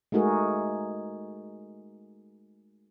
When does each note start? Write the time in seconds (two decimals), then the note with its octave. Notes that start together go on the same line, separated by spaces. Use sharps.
0.12 G#3 A3 D#4 F#4 G#4 A#4